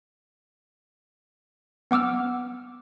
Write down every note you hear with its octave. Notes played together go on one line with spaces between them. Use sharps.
B3 F#5 D6 E6 F6